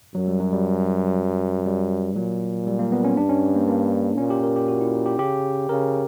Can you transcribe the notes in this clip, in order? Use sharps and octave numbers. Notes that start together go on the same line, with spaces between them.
F#2 F#3
G3
F#3
G3
G3
A#2 F#3
G3
A#3
B3
C#4
G2 D4
C#4
A#3
A#3
A#2 C#4
G4
A#4
G4
F#4
E4
G4
C#3 G4
C#3 A#4